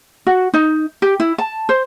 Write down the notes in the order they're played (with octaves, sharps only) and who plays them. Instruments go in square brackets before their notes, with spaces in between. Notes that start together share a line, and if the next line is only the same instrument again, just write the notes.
[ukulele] F#4
D#4
G4
E4
A5
C5